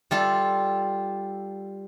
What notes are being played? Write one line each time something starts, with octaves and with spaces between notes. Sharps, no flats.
G3 F4 A4